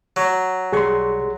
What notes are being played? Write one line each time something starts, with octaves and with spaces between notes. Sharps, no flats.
F#3
B1 G3 G#4 C6 C#6